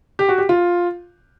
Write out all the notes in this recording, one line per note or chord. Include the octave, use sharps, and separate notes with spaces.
G4
F#4
G4
F4